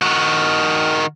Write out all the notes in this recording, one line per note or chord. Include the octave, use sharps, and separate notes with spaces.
D#3 F#4